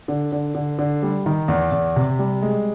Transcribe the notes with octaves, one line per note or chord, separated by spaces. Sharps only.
D3
D3
D3
D3
G3
D#3
E2
E2
C3
G3
G#3